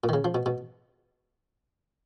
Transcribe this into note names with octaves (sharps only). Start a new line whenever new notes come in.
A#2
D#3
C#3
F3
B2
B2